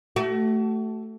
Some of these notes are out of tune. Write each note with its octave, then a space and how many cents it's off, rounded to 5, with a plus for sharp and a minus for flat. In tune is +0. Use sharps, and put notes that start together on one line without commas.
A3 +0 F#4 +35